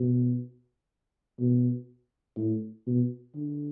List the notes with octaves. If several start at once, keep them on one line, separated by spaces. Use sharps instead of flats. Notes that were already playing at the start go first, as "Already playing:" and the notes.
Already playing: B2
B2
A2
B2
D3